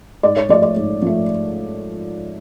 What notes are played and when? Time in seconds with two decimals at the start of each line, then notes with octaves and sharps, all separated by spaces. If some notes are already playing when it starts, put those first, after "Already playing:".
0.23 G#2 D5
0.37 C#5
0.49 F3 A3 D5
0.62 D5
0.76 G#2
1.02 F3 A3